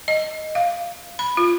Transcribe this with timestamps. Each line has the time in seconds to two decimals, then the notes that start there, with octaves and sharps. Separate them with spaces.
0.08 D#5
0.55 F5
1.19 B5
1.37 F4